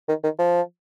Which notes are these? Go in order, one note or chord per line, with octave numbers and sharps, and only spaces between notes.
D#3
D#3
F3